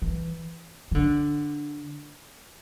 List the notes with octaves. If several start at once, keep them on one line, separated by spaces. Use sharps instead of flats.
E3
E3
D3